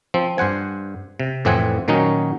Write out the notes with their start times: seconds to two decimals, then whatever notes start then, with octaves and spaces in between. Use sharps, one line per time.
0.14 F3 C4
0.38 G2 C5 F#5 G#5
1.20 C3
1.45 F2 A2 E3 C4 F#5 G#5
1.88 A#2 D#3 F#3 C#4 D#4 F#4